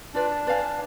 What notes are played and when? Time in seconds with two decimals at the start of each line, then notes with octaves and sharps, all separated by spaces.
0.14 D4 F4 B4 D5
0.47 B4 D5 F5 G#5